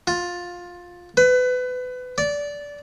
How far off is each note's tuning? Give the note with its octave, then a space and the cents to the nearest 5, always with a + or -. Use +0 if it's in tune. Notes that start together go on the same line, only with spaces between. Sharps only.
F4 +15
B4 +25
D5 -15